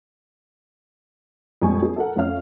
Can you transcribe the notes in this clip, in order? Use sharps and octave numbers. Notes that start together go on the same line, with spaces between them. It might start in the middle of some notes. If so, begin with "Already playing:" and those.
F2 A#2 G3 G#3 G#5 C#6
G#4
A4 A#4 F#5
F2 A3 C#4 F5 F6